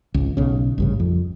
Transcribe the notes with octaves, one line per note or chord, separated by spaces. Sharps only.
G#1 C#2
B1 C#3
A1 G2 C#3
F2